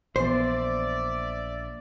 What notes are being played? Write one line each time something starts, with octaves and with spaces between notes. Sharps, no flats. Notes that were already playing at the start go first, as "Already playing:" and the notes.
A#1 E3 B3 C5 D5 E5